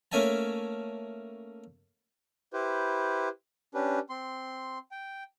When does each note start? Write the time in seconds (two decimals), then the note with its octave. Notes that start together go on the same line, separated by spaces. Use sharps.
0.12 A3 A#3 C#4 E5 G#5 A5
2.53 E4 G4 B4 C5
3.74 C#4 D4 G4 B4
4.10 C4 C6
4.91 G5